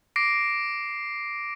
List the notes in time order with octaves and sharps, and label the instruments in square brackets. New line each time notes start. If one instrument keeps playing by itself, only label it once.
[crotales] D6 A#6 C7 D7